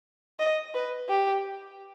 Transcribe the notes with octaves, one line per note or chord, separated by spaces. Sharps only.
D#5
B4
G4